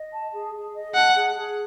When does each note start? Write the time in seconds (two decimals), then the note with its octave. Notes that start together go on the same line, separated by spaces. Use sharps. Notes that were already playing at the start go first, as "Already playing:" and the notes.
Already playing: D#5
0.12 A5
0.32 G#4
0.54 G#4
0.74 D#5
0.95 F#5 A5
1.16 G#4
1.36 G#4